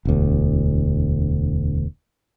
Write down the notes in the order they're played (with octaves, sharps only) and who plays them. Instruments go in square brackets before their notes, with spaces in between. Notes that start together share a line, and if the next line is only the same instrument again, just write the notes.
[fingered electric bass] E1 D2